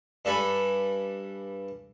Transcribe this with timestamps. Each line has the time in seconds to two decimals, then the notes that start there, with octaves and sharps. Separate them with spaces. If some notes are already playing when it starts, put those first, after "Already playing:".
0.25 G2 D4 A4 D5 G#5 B5